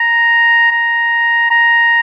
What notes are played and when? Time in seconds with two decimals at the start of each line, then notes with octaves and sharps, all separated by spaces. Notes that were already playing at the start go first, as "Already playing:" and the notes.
Already playing: A#5
0.71 A#5
1.51 A#5